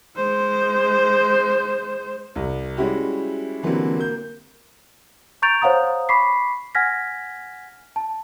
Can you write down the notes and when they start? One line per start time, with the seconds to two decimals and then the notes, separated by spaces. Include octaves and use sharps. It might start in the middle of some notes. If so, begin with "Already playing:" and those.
0.16 G#3 C5
2.36 C2
2.77 G3 G#3 C#4 E4 F#4 G4
3.63 D3 E3 F#3 G3 A#3 C4
3.97 A#3 G6
5.42 A#5 C#6 G6 A6 D7 F7
5.62 C5 C#5 F5 F#5 A#5 D#6
6.09 B5 C#6 D6 B6 C7
6.75 F#5 G#5 F6 G#6 A#6 B6
7.96 A5